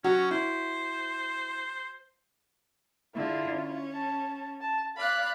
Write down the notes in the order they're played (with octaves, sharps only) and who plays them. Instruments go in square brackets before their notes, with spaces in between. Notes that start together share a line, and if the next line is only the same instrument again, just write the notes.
[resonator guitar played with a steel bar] F#3 F#4 [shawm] C#4
[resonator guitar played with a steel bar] E4 [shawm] C5
[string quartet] D3 G#4 [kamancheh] E4 F4
[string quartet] C#4
[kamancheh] A5
A5
[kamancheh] D5 F5 [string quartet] B5 F#6